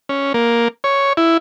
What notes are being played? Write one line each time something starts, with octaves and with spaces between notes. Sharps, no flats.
C#4
A#3
C#5
E4